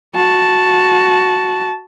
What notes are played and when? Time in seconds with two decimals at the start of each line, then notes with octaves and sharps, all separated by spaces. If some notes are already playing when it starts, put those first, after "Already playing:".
0.15 F#4 A5